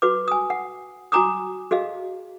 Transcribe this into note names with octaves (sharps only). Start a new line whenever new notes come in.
F#4 B4 D6
G#5 D#6
F#5
F#4 G#5 A#5 D6 D#6
F#4 G#4 D#5 F5